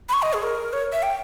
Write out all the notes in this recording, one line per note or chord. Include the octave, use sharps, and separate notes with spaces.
B5
C#6
D#5
G#4
A#4
C#5
E5
G5